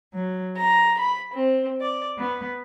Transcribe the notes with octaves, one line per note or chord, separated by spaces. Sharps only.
F#3
A#5
B5
C4
D5
B3